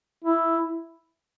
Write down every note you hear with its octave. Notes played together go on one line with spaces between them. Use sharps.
E4